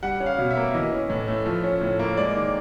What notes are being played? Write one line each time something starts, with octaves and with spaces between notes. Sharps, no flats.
G3 F#5
C#4
F5
B2
E5
A#3
E3 D#5
C#4
A2
A3
F3
C#4
A2
A#3
G#3 D5
D#3